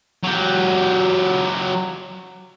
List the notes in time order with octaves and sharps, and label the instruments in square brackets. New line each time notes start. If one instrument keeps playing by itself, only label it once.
[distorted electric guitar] F#3 G4